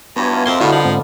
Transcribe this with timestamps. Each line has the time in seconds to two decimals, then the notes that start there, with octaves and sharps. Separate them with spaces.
0.16 G2 E3 F#3 B3 G#5 A5
0.33 F4 F5
0.46 F2 C4 A#4 D#5 C6
0.60 A2 D3 G3 B3 E4 F#4 A5
0.72 F3
0.85 G#2 C4